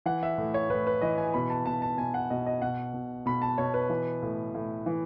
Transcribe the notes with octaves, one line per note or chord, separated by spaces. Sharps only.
E3 F#5
E5
A2
C#5
A2 B4
B4
E3 D#5
G#5
B2 B5
A5
B2 A5
A5
B2 G#5
F#5
B2 D#5
D#5
B2 F#5
B2
B2 B5
A5
B2 C#5
B4
E3
A2
A2
E3